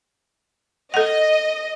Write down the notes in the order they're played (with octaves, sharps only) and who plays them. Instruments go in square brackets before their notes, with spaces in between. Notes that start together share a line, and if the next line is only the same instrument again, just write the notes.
[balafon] A4 F#5 [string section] D#5